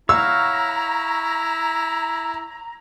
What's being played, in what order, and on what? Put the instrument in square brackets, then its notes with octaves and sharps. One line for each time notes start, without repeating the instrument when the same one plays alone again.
[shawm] E4 [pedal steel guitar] C#5 F5 F#5 [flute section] A#5 [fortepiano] E6